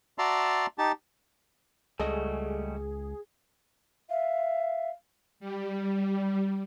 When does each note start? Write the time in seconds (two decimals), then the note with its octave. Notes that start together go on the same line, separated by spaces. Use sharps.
0.18 F#4 D5 E5 A5 A#5 C6
0.78 D#4 G4 A5
2.00 C#2 G3 A3 F#4 G#4 A4 D#5
4.10 E5 F5
5.40 G3